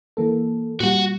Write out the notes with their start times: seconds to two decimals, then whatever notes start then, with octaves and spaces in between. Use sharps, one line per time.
0.17 E3 A#3 A4
0.80 A#2 G3 F#4 F#5